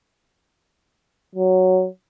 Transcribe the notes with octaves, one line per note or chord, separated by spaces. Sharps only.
F#3